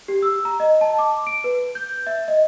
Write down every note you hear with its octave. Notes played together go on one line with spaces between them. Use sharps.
G4
E6
A#5
D#5
A5
D6
D7
B4
G6
E5
D#5